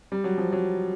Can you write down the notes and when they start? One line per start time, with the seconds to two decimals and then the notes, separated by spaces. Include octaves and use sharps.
0.12 G3
0.24 F#3
0.38 F3
0.53 F#3